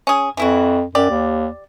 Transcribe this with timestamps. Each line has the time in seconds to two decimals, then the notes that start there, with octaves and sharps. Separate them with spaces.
0.07 C#4 G#4
0.37 F2 E3 E4 F#4
0.95 F#2 G4 D5
1.10 D#2